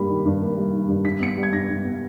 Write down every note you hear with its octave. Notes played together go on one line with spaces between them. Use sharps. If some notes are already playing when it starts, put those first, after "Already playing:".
Already playing: G2 G3 A#3 B5
D#3
G2
A#3
G3
D#3
G2
G2 B6
B3 C#7
B6
G3
G#6
G2 A#6
G2
B3